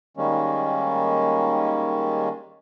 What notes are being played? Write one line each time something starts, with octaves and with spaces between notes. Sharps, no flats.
D#3 G3 G#3 A#3 C#4